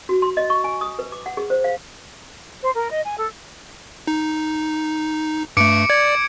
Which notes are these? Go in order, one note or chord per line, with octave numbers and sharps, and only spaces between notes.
F#4
C6
D#5
C#6
G#5
D#6
B4
D6
F#5
G#4
C5
F5
C5
A#4
D#5
G#5
A4
D#4
G2 A3 D6 C#7 D7
D5 G#6